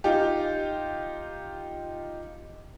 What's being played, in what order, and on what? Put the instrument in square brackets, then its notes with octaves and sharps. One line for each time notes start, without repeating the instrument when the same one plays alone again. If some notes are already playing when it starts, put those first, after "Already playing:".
[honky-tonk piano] D#4 F4 G4